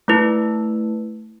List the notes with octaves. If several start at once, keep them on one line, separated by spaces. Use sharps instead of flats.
A3 E4 B4